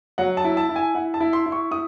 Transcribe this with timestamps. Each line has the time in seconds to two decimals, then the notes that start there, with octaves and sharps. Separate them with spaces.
0.18 F#3 F#5
0.37 A5
0.44 E4
0.57 A5
0.69 E4
0.76 G#5
0.95 E4 F#5
1.14 A5
1.20 E4
1.33 C6
1.46 E4
1.52 C#6
1.71 E4 D#6